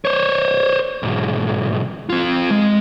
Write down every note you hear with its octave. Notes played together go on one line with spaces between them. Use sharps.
C5 C#5
B1 G#2
C4 F4
G#3